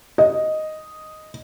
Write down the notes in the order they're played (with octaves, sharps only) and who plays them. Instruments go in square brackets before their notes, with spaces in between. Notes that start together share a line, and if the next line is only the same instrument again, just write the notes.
[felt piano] D#5